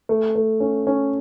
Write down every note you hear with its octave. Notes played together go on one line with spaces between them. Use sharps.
A3
A3
C#4
C#4